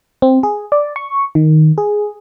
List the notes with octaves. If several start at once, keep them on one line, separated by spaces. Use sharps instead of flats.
C4
G#4
D5
C#6
D#3
G#4